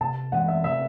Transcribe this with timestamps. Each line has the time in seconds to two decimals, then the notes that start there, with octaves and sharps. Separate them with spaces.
0.01 C3 A5
0.32 E3 G#3 C#4 F#5
0.48 E5
0.64 C3 E5